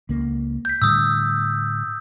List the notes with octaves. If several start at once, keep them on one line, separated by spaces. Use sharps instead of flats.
C#2 A#3
G6 B6
A2 D3 G3 D#6 E6